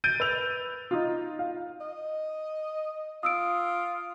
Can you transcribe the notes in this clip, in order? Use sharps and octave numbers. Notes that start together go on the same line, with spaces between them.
G6 A6 D7 D#7
B4 E6 F7
D#4 F4
F5
D#5
F4 D#6 E6 D7